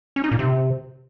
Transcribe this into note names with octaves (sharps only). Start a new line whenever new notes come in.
C#4
D#4
A#2
C3